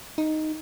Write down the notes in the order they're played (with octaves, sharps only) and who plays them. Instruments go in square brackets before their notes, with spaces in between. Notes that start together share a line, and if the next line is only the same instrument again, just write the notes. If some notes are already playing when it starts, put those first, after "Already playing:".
[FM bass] D#4